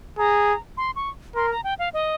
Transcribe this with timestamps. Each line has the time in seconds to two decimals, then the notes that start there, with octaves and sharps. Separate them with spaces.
0.18 G#4 A#5
0.77 C6
0.96 C#6
1.35 A#4 C6
1.51 A#5
1.64 G5
1.79 F5
1.94 D#5